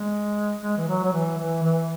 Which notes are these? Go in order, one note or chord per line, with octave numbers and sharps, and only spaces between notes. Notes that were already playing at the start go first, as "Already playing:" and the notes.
Already playing: G#3
G#3
E3
F#3
F#3
E3
E3
E3